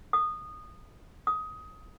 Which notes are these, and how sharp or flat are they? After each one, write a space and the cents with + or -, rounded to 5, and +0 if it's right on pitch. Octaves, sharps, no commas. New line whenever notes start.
D#6 -15
D#6 +15